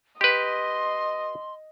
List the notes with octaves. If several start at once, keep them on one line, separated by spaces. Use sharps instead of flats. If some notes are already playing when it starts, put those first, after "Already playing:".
G4 B4 D#5 C6